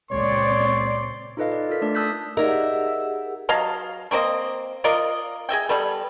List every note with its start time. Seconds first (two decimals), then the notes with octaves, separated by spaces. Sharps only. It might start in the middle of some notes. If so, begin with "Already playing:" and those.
0.11 C#2 A#2 G#3 C4 C#5 D5 C6
1.37 D#4 F4 A4 B4 D#5 F5
1.52 D5
1.69 F4 A4 A#4 B6
1.82 A3 D4 D5
1.95 A5 D#6 E6 F#6 G6 B6
2.37 D#4 G4 G#4 A#4 D5 E5 F#5
3.49 F#3 D#5 F5 A5
4.11 A3 A#3 C4 D#5
4.84 F4 A#4 D5 D#5
5.49 G#4 D#5 E5 G5
5.69 G3 B3 A4 B4